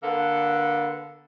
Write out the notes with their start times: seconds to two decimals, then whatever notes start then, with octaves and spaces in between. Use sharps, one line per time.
0.03 D3 A#3 B3 A4